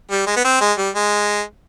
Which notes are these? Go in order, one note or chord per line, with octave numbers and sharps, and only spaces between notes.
G3
G#3
B3
C4
G#3
G3
G#3